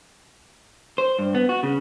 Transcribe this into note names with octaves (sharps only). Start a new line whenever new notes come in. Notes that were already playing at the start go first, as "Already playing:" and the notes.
C5
G2
B3
F#4
C#3